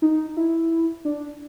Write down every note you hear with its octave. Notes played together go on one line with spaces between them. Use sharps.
D#4
E4
D4